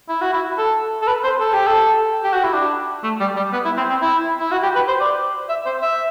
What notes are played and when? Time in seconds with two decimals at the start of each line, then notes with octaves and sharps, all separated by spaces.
0.09 E4
0.21 F#4
0.34 E4
0.58 A4
1.02 A4
1.07 B4
1.24 C5
1.40 A4
1.53 G4
1.67 A4
2.24 G4
2.34 F#4
2.44 E4
2.54 D4
3.04 A3
3.20 G3
3.36 G3
3.53 B3
3.65 E4
3.77 C4
3.89 C4
4.02 E4
4.39 E4
4.52 F#4
4.63 G4
4.75 B4
4.88 C5
5.00 D5
5.49 E5
5.66 C5
5.82 E5